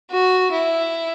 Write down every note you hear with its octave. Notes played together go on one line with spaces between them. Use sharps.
F#4
E4